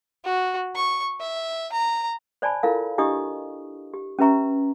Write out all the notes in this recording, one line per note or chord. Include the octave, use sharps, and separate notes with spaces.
F#4
C#6
E5
A#5
C5 D5 G#5 A5 B5
E4 F4 A4 A#4 F5
D4 E4 G4 D#5 C#6 D#6
G4
C#4 G4 B4 E5 A#5 C#6